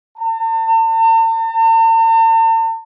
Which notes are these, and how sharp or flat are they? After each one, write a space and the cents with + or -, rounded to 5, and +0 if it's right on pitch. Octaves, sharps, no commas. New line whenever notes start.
A5 +45